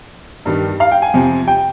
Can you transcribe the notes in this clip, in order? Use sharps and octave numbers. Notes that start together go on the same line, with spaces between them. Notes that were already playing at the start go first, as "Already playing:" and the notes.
G2 D#3 G3
F5
G5
G#5
F2 C3 F3
G5